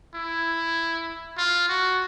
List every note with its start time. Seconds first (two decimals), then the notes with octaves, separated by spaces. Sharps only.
0.15 E4
1.38 F4
1.69 F#4